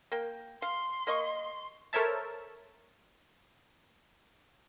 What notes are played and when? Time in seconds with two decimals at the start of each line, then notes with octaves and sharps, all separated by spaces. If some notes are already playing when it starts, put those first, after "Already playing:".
0.12 A#3 G5
0.62 F5 C6
1.07 A#3 D#5 C#6
1.93 A4 A#4 C5 C#5 E5 A5